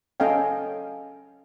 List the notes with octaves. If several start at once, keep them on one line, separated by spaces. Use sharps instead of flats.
C#4 A4 D#5 F5 G5